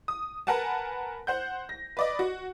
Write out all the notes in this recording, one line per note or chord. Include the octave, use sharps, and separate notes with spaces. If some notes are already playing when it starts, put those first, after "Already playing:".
D#6
A#4 B4 F#5 G#5 A5
C5 F#5 G6
A#6
B4 D5 D#5
F#4